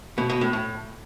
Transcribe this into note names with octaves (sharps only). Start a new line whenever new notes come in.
B2
B2
A2
A2